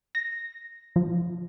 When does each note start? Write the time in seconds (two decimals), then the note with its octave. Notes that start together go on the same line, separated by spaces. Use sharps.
0.15 A#6
0.96 F3